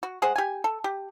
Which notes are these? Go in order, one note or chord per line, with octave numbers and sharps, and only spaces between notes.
F#4
G#3 G#4 C5 F#5
G4 G#5
A4
G4